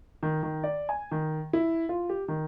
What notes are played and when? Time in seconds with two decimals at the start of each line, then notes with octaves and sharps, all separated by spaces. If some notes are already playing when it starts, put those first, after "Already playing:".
0.23 D#3
0.43 D#3
0.63 D5
0.89 G#5
1.11 D#3
1.53 E4
1.89 F4
2.09 G4
2.28 D#3